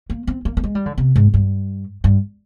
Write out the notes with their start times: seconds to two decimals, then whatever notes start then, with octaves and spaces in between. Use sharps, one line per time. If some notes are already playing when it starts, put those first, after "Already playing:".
0.10 A#3
0.27 C4
0.45 A#3
0.57 A#3
0.64 G#3
0.75 G3
0.86 D3
0.98 C3
1.16 G#2
1.34 G2
2.04 G2